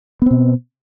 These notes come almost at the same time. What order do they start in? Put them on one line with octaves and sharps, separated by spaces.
B3 C4 B2